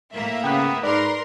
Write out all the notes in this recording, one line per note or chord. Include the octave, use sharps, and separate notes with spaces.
A2 A#3 E5
C#3 B3 G5 F#6
G#2 A#4 B4 D5 C6